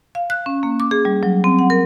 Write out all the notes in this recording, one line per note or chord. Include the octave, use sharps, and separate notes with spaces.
F5
F#6
C#4
A#3
D6
G#4
G3
F#3
C4
F#5
A#4